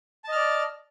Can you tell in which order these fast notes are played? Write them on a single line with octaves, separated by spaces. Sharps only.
A5 D#5 F6 D5